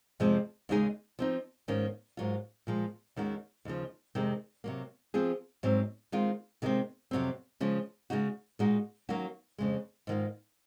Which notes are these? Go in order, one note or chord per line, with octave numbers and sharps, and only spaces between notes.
F2 C3 F3 G#3 C4
D#2 C#3 G#3 D#4 G#4
F3 C4 D#4
G#2 D#3 A#3 C#4
G#2 F#3 A#3 F4
A#2 F3 G#3
D#2 D#3 G#3 C#4 F#4
D#2 C#3 F3
F2 C3 D#3 G#3 C4
C3 F#3 A#3
F3 C4 F4 G#4
G#2 F#3 C4
D#3 G#3 C4 F4
C3 D#3 G#3 C4
F2 C3 F#3 C4
C#3 F3 G#3 C#4
C#3 G#3 D#4 F#4
A#2 G#3 D#4 F#4
D#3 F#3 A#3 C#4 F#4
F2 C#3 G#3
G#2 D#3 A#3 F4